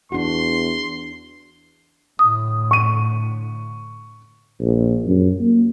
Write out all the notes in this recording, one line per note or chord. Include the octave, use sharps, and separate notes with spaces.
E2 D4 F#4 C6
A2 D3 D#6
C#6 D#7
A#1
F#2
A#3